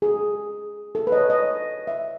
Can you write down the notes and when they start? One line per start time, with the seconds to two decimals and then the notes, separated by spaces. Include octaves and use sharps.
0.02 G#4
0.95 A4
1.07 B4
1.12 D#5
1.17 C#5
1.30 D#5
1.87 E5